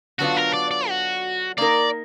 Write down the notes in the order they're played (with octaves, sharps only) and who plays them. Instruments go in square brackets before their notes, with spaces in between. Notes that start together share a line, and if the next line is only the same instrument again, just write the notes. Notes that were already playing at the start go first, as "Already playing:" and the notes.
[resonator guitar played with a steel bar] D3 F#3 B3 D4 F4 [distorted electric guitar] F#4
[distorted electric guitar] A#4
D5
D5
F#4
[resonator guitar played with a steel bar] A#3 D#4 A#4 [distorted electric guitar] D5